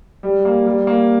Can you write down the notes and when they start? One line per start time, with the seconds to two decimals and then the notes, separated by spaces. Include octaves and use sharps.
0.23 G3
0.45 A#3
0.66 G3
0.87 A#3